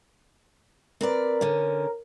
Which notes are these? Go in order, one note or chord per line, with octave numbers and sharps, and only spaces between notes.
C4 A#4 B4 D5
D3 C#4